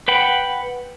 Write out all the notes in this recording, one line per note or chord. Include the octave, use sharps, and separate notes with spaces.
B4 F#5 G5 B5